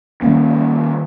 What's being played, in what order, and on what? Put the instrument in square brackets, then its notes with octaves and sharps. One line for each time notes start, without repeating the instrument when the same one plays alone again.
[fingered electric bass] D#3 G3 A#3 C#4